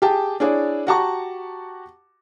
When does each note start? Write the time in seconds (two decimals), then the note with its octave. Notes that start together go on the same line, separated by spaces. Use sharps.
0.02 G4 G#4 G5 A5
0.40 D4 E4 G#4 C#5 D5
0.87 F#4 G4 F#5 A5 A#5 C#6